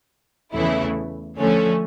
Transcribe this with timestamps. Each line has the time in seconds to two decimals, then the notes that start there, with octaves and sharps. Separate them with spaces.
0.54 E2 C#3 E3 A3 E4
1.39 D3 F3 A3 C#4